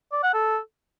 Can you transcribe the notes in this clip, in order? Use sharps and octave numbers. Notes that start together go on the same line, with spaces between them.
D5
F#5
A4